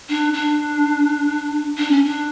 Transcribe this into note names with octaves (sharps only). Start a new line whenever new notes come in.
D4
D4
D4
C#4
D4